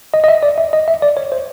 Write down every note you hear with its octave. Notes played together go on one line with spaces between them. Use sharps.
D#5
D#5
E5
D5
E5
D#5
E5
D5
C#5
C5